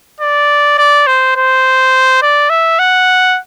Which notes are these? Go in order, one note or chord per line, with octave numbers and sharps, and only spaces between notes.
D5
D5
C5
C5
D5
E5
F#5